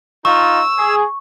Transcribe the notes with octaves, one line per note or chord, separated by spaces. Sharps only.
D#4 F4 C#6 E6
G#4